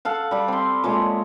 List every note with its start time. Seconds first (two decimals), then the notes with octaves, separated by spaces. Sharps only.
0.05 A4 F5 F#5
0.31 G3 D5
0.48 C4 C6
0.84 A#2 G#3 A3 C#5